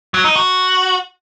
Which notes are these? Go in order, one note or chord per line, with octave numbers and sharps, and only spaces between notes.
F#3
D#4
F#4